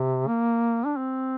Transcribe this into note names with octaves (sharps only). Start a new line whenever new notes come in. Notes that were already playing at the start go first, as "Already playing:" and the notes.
Already playing: C3
A#3
D4
C4